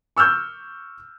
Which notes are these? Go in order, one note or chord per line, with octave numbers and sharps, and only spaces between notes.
C#6 E6 F6 G6